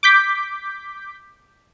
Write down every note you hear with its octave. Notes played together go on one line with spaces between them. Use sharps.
D6 G6 B6